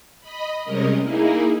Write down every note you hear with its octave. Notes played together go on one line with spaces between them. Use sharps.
D#5 B5
C3 G3 G#3 C#4 A#4 D#5
A#3 D#4 E4 G#4